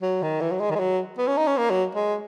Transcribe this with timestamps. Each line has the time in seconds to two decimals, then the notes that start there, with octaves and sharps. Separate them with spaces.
0.02 F#3
0.22 D#3
0.41 E3
0.51 F#3
0.60 G#3
0.71 D#3
0.75 G#3
0.79 F#3
1.18 B3
1.27 C#4
1.37 D#4
1.47 C#4
1.58 A#3
1.71 F#3
1.95 G#3